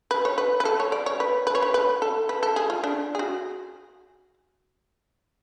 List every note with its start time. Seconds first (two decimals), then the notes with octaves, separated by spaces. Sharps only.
0.11 B4
0.25 C#5
0.38 B4
0.60 B4
0.65 A4
0.80 C#5
0.92 D5
1.06 C#5
1.20 B4
1.47 B4
1.55 C#5
1.62 B4
1.74 B4
2.02 A4
2.29 B4
2.43 A4
2.56 G#4
2.70 F4
2.84 D4
3.15 G#4
3.19 F#4